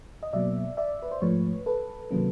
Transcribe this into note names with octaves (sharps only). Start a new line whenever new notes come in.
D#5
B2 F#3 A#3 D5 E5
D5 E5
B4
C5
G#2 F3 A3 B4 C#5
A4 B4
C3 D#3 F#3 A#3 C#4